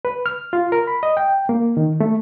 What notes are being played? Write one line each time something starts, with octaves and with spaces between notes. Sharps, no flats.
B4
F6
F4
A#4
B5
D#5
G5
A#3
D#3
A3